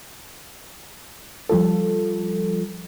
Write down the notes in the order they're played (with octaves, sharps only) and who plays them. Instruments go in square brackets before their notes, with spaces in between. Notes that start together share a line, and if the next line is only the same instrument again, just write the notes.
[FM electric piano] F3 G3 F4 A4